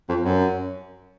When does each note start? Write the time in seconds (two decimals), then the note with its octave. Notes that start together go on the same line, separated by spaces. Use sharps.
0.09 F2
0.23 F#2